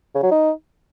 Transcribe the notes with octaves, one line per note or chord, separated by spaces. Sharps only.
C#3
F#3
D#4